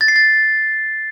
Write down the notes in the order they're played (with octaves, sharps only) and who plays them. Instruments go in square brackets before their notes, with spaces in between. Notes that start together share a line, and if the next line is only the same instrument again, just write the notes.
[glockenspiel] A6
C7
A6